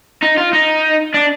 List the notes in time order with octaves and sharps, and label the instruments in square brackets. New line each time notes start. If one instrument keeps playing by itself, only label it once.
[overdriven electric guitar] D#4
F4
D#4
D4